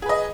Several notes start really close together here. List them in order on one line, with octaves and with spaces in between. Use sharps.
G#4 B4 D#5